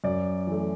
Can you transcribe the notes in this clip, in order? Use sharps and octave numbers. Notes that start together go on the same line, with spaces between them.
F#2 D5
E3 A3